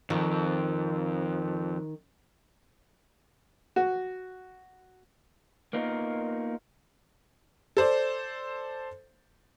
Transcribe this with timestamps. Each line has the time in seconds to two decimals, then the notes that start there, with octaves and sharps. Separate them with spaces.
0.10 F2 D#3
3.76 F#4
5.73 A#3 B3 D#4 F4 F#4 A#4
7.77 A4 C5 D5